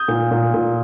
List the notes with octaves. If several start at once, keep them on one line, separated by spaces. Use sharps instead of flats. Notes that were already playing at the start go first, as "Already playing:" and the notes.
Already playing: D#6 G6
A#2
A#2
A#2